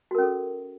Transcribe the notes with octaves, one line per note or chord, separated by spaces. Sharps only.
C#4 F#4 A4 A#4